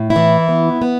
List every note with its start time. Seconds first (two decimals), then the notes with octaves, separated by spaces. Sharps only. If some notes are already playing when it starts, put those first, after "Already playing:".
Already playing: A2
0.10 E4
0.16 E3
0.49 B3
0.82 B3